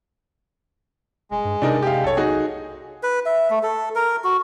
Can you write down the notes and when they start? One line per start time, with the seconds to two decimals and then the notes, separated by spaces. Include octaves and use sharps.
1.31 D#1 G#3
1.45 G2
1.62 C3 D4 D#4 A#4
1.82 G4 F5
2.04 B1 A4 C#5
2.17 D#4 F#4 G#4
3.03 B4
3.26 E5
3.50 A3
3.63 A4
3.96 A#4
4.24 F#4